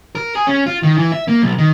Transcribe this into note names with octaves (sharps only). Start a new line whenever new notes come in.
A#4
G#4
C#4
F4
D#3
E3
E5
A#3
B1
D#3